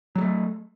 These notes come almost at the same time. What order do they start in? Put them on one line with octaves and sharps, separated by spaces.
F#3 G3 A3